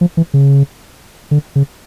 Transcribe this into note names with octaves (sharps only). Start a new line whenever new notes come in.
F3
E3
C#3
D3
C#3